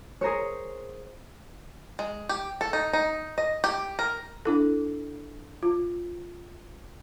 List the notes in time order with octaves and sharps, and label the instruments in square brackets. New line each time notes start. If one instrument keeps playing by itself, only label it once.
[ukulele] G#4 A#4 C5 C#5
[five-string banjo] G#3
G4
A4
D#4
D#4
D#5
G4
A#4
[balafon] D4 E4 A4
F4